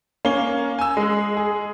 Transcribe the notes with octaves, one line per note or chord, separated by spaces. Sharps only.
A#3 C#4 G7
G#5 E6
G#3
G#4